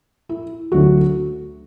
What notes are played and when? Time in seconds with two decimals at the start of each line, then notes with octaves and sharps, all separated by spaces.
0.29 E4
0.72 D2 D3 F#3 A3 F#4